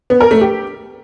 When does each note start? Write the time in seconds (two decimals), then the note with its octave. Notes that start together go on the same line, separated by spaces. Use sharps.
0.10 B3
0.20 A#4
0.31 A3
0.41 G4